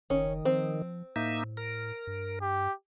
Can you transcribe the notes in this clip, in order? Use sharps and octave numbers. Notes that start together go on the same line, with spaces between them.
F#1 D#3 C#4
F3 C4
A2 A#3 D#4 E5
A#4
G2
G4